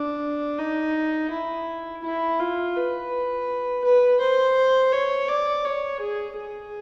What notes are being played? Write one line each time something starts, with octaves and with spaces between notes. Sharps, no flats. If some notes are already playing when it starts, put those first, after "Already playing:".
Already playing: D4
D#4
E4
E4
F4
B4
B4
C5
C#5
D5
C#5
G#4
G#4